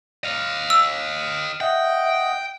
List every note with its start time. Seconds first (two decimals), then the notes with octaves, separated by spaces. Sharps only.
0.24 D#5 F5
0.70 E6
1.61 D#5 E5 F#5 G5